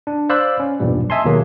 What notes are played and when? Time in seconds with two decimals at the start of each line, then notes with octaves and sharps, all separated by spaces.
0.07 D4
0.29 C5 D5 F5 B5 E6 F#6
0.60 C#4
0.80 B1 E2 G2 A#2 G3
1.10 D#5 E5 G#5 A5 C6
1.24 D#2 B2 D#3 F#3 A#3 G#4